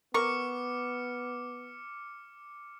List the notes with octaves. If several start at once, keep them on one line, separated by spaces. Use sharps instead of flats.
B3 A#4 C#6 D6 F6 C#7